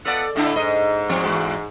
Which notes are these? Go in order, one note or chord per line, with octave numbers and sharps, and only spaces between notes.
B3 F4 A4 D5 F#5
A2 D3 A3 D4 E4
G#2 D#5
F3 C4
E2 G#3 F#4